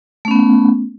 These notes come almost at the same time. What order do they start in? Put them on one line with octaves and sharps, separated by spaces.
A3 C#4 B3